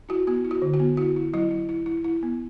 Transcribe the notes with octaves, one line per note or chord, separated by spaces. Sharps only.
E4 F#4
B3 F#4
E4
F#4
D3
F#4
B3
E4 F#4
E4
F#3 E4
E4
E4
E4
E4
B3